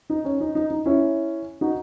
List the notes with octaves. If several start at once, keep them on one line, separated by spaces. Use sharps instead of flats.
D#4
C#4
D#4
D#4
D#4
C#4 E4
D#4 F#4